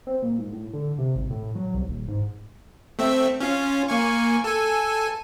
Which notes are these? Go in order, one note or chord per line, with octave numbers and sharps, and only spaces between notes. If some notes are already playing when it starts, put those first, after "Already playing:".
C4
A#2
G#2
A2
D3
C3
G#1
A2
F#3
C2
D#1
G#2
A3 C4 E5
C#4 F4
A#3 G#5 C#6
A4 G#5